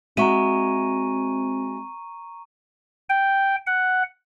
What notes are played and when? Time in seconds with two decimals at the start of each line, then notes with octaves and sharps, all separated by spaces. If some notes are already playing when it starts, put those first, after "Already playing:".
0.17 G#3 C4 F#4 E5 A#5 C#6 D#7
3.09 G5
3.67 F#5